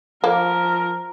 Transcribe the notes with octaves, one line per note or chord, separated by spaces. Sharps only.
F3 A#3 A#4